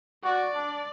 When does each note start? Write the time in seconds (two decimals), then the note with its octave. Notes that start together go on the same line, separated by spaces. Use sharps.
0.24 F#4 D5
0.55 D4